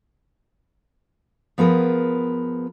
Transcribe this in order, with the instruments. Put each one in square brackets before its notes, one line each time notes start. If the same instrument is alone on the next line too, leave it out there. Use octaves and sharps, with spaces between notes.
[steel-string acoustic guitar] F3 B3 G#4 A#4 B4